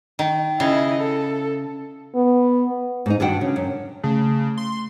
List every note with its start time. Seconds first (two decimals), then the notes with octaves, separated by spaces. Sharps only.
0.19 D#3
0.60 C#3 E4 D#5
1.00 A4
2.15 B3
3.06 G#2 C4 D#4
3.20 G2 D#3 D4 F#4 F#5 G5
3.41 C#3
3.56 F#2
4.04 C#3 A3
4.58 C6